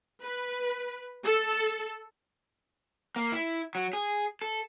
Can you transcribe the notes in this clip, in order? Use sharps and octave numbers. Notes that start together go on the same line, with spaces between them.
B4
A4
A#3
E4
F#3
G#4
A4